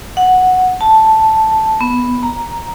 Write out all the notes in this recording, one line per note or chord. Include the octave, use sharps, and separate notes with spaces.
F#5
A5
B3
A#5